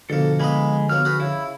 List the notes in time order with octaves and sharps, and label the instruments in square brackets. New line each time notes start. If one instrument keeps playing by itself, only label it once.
[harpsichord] B2 A#3 [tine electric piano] D3 F3 [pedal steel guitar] A4
[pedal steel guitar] G#3 B5 [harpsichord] A#3 B3 D#5
[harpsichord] F#3 A#3 B3 [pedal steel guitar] F6
[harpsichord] F#4 G#4 B4
[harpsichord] C#3 [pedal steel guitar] E4